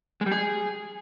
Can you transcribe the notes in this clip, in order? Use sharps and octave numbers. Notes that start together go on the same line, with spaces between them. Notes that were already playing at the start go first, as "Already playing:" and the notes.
G#3
G3
G#4